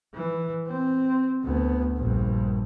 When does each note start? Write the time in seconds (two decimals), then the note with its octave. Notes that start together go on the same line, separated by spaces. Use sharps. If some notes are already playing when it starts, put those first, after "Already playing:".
0.15 E3
0.67 C4
1.44 D2 B3
1.97 A#1 G2